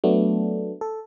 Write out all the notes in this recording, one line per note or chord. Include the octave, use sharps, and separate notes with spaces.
F#3 A3 B3 D4
A4